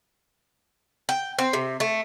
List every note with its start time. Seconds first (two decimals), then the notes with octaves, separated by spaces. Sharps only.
1.09 G5
1.39 C4
1.53 C3
1.80 A3